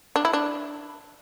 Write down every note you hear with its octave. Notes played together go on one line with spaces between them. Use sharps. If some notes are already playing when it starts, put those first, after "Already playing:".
D4
E4
D4